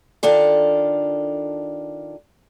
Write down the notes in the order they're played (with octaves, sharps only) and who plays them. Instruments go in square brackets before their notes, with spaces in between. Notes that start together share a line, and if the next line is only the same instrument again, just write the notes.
[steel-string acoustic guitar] D#3 D4 F4 A4